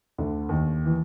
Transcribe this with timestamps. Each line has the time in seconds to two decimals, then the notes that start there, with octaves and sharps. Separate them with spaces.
0.18 D2 D3
0.49 D#2 D#3
0.86 E3